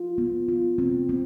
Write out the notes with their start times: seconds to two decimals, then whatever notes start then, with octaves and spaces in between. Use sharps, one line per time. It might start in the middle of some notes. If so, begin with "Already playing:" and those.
Already playing: F4
0.18 B3
0.49 F4
0.78 C4
1.09 C4